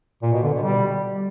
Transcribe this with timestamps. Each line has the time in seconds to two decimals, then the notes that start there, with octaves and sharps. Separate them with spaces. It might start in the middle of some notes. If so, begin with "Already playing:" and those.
0.22 A#2
0.32 B2
0.43 D3
0.53 B2
0.63 G3